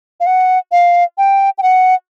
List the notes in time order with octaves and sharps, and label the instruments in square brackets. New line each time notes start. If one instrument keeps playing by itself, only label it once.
[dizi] F5
F#5
F5
G5
G5
F#5